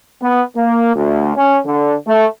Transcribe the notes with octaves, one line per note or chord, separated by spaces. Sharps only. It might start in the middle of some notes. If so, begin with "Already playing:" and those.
B3
A#3
D2
C#4
D3
A3